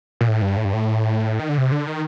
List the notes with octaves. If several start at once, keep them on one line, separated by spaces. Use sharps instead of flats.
A#2
A2
G2
A2
G2
A2
D#3
D3
C3
D3
D#3